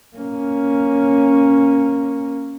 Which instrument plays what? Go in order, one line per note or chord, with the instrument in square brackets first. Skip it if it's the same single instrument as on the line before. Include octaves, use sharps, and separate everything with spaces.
[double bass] A#3 C#4